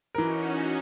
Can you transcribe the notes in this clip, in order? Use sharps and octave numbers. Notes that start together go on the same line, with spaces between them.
E3 C#4 D#4 F#4 A#4